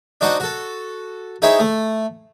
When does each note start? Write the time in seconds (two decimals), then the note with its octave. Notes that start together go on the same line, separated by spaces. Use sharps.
0.21 D4 D#4 F#4 C5 D#5 F#5
0.40 F#4 A4
1.42 D#4 E4 G#4 C5 C#5 E5
1.60 A3